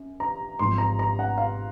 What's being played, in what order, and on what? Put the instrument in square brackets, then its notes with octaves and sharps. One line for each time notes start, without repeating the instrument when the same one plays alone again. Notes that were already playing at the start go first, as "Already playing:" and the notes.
Already playing: [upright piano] F#2
A#5
G#1 G#2 F3 C6
A#5
A#5
F#5
F5